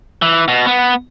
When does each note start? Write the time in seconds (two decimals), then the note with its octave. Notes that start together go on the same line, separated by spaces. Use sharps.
0.22 E3
0.48 B2
0.66 B3